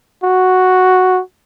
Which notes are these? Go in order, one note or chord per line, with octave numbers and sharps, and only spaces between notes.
F#4